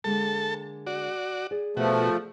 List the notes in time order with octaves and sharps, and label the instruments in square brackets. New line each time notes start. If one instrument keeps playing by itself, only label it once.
[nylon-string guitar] D3 G#3 A#3 [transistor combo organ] A4 A5
[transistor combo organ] F#4 D5
[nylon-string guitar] G#4 D5
[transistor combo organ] B2 F#4 [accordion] F3 A3